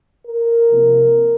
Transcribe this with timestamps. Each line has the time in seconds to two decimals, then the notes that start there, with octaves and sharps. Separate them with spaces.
0.26 A#4
0.70 C3 F3 A#3